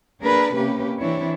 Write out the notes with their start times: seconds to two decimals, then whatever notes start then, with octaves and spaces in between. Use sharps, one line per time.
0.20 A#3 D4 G#4 A#4 B4
0.55 C3 A#3 C#4 G4 B4
1.00 E3 C4 D4 E4 C#5